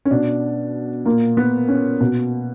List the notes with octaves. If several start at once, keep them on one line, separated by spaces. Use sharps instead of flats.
C#4
B2 D4
A#2 A#3
B3
C#4
B2